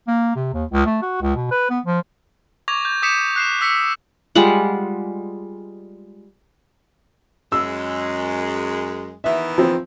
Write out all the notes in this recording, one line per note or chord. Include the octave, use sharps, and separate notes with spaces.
A#3
C3
D#2
C#2
A3
F#4
C#2
B2
B4
B3
F3
C#6 D6 G#6 A#6 F7
G6
D6 D#6 G6 B6 C#7 E7
F#6 C7 E7
E6 B6 C#7
G3 G#3 F4 F#5
F#2 G#3 E6
D#3 E3 B3 E5
F3 C4